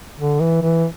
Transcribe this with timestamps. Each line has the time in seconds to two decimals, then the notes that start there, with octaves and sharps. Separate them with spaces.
0.18 D3
0.40 E3
0.62 E3